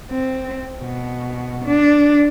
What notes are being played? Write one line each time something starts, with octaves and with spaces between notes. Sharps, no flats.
C4
B2
D4